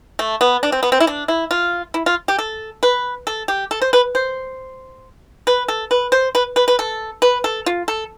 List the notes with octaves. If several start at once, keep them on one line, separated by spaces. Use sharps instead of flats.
A3
B3
D4
C4
B3
C4
E4
D4
E4
F4
E4
F4
G4
A4
B4
A4
G4
A4
C5
B4
C5
B4
A4
B4
C5
B4
B4
B4
A4
B4
A4
F4
A4